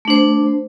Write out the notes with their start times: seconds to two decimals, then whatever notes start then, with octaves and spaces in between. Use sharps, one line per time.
0.05 A3
0.08 D4
0.10 C5